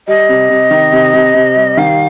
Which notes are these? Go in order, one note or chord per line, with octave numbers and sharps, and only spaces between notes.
G3 D#5
C3
C3
D#3
C3
C3
C3
G3
D#3 F5